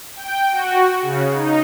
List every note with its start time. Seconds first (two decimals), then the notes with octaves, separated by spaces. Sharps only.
0.16 G5
0.52 F#4
1.02 C#3
1.34 D#4